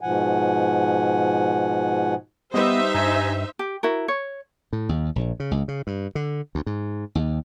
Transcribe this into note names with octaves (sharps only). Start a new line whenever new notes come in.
G#2 B2 F3 F#5 G#5
G3 B3 D#4 B4 C5 D#5 E5 D#6
G2 G#5 A#5
G4
E4 F#4 A#4
C#5
A2
D#2
A#1
C#3
C#2
C#3
G2
D3
D2
G#2
D#2